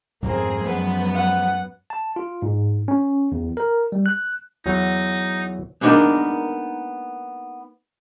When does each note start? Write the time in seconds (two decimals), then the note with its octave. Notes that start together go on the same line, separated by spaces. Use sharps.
0.22 F2 G#2 A#3 C4 G#4
0.64 F#2 F3 G#3 B3 B4
1.14 F#5
1.90 A5
2.16 F4
2.42 G#2
2.88 C#4
3.32 E2
3.57 A#4
3.92 G3
4.06 F#6
4.66 E2 F#3 D#4
5.81 G#3 A#3 B3 D4 D#4 A#4